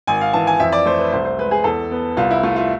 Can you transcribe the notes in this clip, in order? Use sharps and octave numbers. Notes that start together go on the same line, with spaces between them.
G#1 G#5
F5
E3 A5
G#5
F2 E5
D5
A3 C5
B4
C2 C5
C5
G#3 B4
G#4
E2 A4
B3
C2 F4
E4
A3 F4
F4